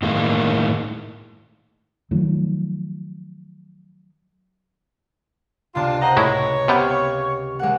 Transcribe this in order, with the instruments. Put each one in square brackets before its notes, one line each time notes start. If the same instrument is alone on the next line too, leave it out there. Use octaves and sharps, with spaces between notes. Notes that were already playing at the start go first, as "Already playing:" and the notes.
[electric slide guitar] A2 D#3 G#3 A#3
[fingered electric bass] D#3 F3 F#3 A3
[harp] C#2 C3 A5 [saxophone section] D4 F4
[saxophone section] C5 D#5 F#5 [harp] A#5
[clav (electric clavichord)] A2 G#3 E4 [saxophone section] C#5 [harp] A#6
[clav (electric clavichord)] C3 B3 G5 [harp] G4 F5 F6
[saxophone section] G#2 A#3 [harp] G#3 F#5